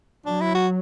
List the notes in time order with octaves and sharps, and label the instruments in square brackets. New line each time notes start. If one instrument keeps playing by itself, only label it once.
[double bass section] F#3 [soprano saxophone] D4
[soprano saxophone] E4
F#4